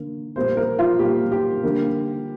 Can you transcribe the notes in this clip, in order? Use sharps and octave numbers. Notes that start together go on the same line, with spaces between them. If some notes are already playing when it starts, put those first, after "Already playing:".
Already playing: D3 A#3
A#2 G3 A#3 C5
A#4
F4
A#2 G3 A#3 G4
G4
D3 G3 A#3